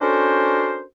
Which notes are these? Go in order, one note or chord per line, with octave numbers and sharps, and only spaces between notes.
C#4 D4 F#4 A4 A#4 C5